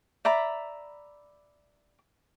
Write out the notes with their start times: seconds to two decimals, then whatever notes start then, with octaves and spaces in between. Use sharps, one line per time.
0.25 D5 E5 A#5 B5